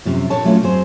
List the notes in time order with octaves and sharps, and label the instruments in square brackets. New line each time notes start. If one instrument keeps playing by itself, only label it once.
[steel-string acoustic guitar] F#2 C3 F3
A#2 D4 A4 C#5 A5
A#2 F#3 A3 C#4 D4 F4
F2 F#3 G#4 C5